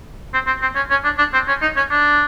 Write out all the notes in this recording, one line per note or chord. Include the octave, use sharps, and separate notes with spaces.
C4
C4
C4
C#4
C#4
D4
D4
C4
C#4
D#4
C#4
D4